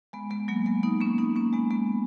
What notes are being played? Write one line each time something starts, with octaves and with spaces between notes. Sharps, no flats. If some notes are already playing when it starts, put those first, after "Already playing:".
G#3 B3
G#3 B3
F#3 A#3
G#3 B3
B3 D#4
A#3 C#4
B3 D#4
A#3 C#4
G#3 B3
G#3 B3